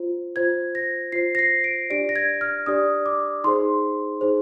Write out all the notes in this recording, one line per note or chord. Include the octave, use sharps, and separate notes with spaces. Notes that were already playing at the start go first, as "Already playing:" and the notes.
Already playing: F4 C5
F4 C5 G#6
A#6
F4 C5 C7
A#6
C7
D7
D4 G4 D5 D7
A#6
G#6
F6
D4 G4 D5 D#6
D6
D#4 G#4 C5 C6
D#4 G#4 C5